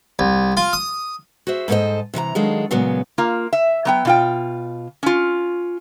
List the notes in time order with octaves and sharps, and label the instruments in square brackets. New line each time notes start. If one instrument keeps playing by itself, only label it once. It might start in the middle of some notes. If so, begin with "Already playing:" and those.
[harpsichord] C2
F4
D#6
[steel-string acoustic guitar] F#4 G#4 C5 E5
G#2 E4 A4 B4 C5 D#5
C3 E3 E5 A#5
D#3 F#3 G#3 D4 A4 F5
A#2 C#3 F#3 G#3 B3
[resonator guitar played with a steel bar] A#3 F4
E5
F#3 B3 G5
B2 F4 G5
C#4 F4